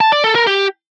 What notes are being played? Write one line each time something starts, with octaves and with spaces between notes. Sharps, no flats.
A5
D5
A4
A#4
G4